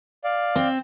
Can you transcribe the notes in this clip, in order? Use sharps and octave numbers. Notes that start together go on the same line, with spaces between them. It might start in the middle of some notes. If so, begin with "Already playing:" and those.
D5 F5
C4